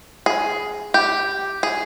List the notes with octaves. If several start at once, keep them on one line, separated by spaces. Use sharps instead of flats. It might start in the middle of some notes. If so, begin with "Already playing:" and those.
G#4
G4
G#4